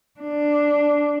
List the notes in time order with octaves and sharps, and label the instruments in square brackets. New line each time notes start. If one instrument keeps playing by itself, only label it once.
[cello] D4